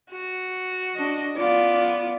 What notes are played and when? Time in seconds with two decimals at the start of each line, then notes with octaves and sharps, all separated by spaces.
0.11 F#4
0.96 D4 D#5
1.37 B3 F4 D5